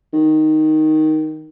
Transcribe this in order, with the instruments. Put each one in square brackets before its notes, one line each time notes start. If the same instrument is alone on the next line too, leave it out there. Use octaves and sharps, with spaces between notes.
[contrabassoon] D#3